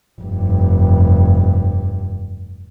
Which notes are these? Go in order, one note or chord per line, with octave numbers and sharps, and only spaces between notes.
F1 G2